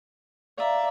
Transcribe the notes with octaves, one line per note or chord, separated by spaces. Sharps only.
D5 E5 F5 A#5